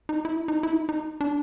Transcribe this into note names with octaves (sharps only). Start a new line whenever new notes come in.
D#4
E4
D#4
E4
D#4
D#4
D4